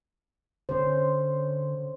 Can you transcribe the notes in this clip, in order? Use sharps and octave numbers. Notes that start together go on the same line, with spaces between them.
D3 C#4 C5